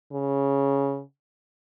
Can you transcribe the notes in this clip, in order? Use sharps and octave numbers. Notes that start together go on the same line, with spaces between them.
C#3